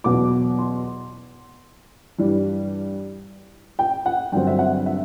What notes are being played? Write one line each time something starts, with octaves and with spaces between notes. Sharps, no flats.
E2 B2 F#3 B3 D6
C6
G2 E3 G3
G5
F#5
G2 D3 F#3 C4 G5
E5
F#5
E5